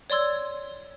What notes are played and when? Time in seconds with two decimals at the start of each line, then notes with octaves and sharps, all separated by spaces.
0.10 C#5 D5 C6 E6 G#6